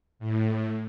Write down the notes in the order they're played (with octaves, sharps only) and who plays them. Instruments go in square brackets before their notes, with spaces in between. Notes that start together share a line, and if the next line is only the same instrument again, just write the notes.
[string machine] A2